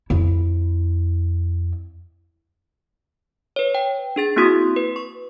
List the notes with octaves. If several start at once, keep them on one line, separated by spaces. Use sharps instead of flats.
F2 E4
B4 C#5
G5
D4 G#4 A6
A#3 C4 E4 F#4 C6 D#6
B4
C#6